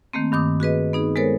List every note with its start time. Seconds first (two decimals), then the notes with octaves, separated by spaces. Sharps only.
0.13 D#3 A3 A#3 C4
0.32 G2 D#3 D6 D#6
0.60 F#4 G#4 B4 D#5
0.93 B3 D#4 G#4
1.16 G#3 B3 A4 A#4 C5 C#5